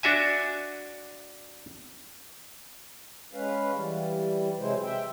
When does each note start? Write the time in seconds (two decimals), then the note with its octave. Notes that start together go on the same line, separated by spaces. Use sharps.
0.03 D4 F#4 E5 G#5
3.33 G#3 C#4 B4 F5
3.74 E3 G3
4.59 C3 F#3 G#3 E4 C5
4.83 E5 G5